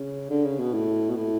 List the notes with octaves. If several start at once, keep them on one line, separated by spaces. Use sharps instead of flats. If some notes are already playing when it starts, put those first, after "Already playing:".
Already playing: C#3
D3
C#3
B2
A2
B2
A2